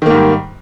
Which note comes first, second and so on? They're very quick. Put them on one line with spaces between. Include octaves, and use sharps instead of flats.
D#3 A#3 G#2 G3